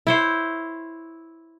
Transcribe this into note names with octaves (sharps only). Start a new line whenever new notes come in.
E4 C5 C#5